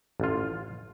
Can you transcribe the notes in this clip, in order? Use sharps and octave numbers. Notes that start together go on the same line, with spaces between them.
A1 F4